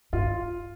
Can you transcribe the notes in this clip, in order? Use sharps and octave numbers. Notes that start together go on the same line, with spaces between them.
G2 F4